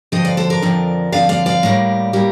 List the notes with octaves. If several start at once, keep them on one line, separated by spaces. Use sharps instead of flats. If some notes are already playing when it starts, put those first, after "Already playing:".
F2 D3 F3 C5 D#5
D5 F5
A4 C5
A#4 D5
F2 D3 F3
F2 D3 F3 D5 F5
D5 F5
D5 F5
A2 G3 A#3
A2 G3 A#3